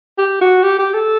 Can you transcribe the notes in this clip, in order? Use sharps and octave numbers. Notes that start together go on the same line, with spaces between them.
G4
F#4
G4
G4
A4